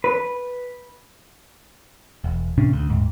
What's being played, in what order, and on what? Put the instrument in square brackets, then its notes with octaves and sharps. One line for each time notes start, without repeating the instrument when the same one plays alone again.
[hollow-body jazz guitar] B4
[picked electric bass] E1
A2 C3 C#4 D4
D2
D#1 G#2